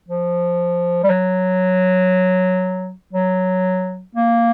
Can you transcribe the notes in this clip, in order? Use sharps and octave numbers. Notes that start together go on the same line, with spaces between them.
F3
G3
F#3
F#3
A#3